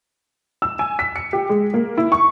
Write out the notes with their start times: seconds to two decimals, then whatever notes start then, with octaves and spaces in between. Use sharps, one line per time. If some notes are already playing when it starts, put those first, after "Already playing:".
0.62 E6
0.79 G#5
0.99 B6
1.16 C#7
1.33 G4
1.49 G#3
1.74 A#3
1.97 E4
2.12 C#6